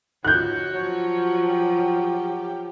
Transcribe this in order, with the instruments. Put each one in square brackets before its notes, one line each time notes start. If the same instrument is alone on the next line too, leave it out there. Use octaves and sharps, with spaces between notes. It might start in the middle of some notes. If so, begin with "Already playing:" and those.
[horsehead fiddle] F#4 C#5 [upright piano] F#6 G6
[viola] F3 [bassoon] F#3
[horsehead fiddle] G4